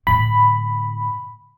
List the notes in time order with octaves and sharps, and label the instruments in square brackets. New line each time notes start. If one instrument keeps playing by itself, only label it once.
[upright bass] A2 D3 [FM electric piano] B5